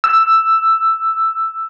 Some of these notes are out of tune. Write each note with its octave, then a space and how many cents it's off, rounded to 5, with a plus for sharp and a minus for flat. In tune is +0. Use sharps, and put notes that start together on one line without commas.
E6 +5